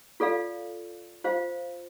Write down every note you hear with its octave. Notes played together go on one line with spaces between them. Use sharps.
F4 A4 D5 F5
F4 C5 F5